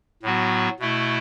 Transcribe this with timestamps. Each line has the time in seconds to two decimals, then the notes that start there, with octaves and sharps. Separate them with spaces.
0.23 A2 F#3 B3 F#4
0.79 B2 A3 E4